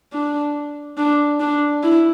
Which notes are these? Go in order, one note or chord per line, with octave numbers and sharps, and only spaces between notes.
D4
D4
D4
E4